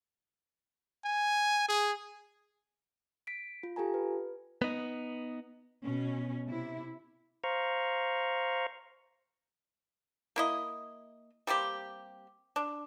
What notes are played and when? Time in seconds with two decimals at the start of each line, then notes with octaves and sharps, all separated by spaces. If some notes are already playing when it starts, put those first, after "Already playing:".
1.05 G#5
1.69 G#4
3.27 B6 D7
3.63 F4
3.76 F4 G4 A4 G#5 A#5
3.94 B4
4.62 B3 D#4
5.84 B2 C#4
6.47 C3 E4
7.44 C5 F5 A#5 C#6
10.36 A#3 E4 D#5
11.47 G3 A#3 C4 G4
12.56 D4